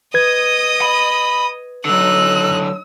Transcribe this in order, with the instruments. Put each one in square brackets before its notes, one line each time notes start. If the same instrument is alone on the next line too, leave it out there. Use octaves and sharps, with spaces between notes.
[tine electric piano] B4 G#6 [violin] D#5 D#6
[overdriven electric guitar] B5
[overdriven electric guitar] D3 F#3 [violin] D#4 F#6 [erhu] E6